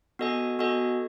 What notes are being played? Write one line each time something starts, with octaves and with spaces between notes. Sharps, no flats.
B3 F#4 A4 D#5 G#5
B3 F#4 A4 D#5 G#5